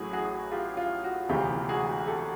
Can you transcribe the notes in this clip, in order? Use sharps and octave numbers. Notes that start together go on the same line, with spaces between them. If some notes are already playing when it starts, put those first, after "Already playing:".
Already playing: A1 A2 F#3 F#4 G#4
F#4 G#4
F4 G4
F4
F#4
E1 D2 C3 E3 G#3 F4 G4
F#4 G#4
G4 A4